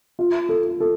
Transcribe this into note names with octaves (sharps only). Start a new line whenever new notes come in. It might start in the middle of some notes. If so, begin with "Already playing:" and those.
F4
A4
A4